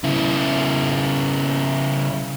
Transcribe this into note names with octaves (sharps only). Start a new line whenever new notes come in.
C#3 E4